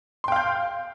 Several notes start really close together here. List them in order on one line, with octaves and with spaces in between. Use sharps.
C6 G5 F5 G6